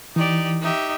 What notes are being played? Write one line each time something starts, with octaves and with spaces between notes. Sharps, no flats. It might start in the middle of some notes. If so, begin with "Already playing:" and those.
E3 D#4 G4 D5
D#4 G4 E5